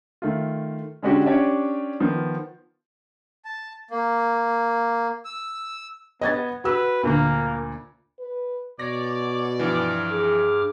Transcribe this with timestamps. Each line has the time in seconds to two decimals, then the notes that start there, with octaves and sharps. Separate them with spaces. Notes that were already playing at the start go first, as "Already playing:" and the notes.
0.22 D#3 A3 F4
1.03 D3 G#3 C#4 D4 F#4 G4
1.26 C#4 D4 G4 C#5 D5
2.00 D#3 F3 B3
3.45 A5
3.91 A#3
5.25 E6
6.21 B3 D#5 G#6 A6
6.64 F#4 B4 E6
7.03 D2 A#2 A#3
8.19 B4
8.79 B2 C#5 D5 A#6
9.59 G2 E3 F3 D6 F6
10.11 G#4